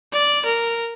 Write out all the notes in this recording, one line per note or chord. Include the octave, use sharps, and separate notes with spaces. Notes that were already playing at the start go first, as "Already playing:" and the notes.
D5
A#4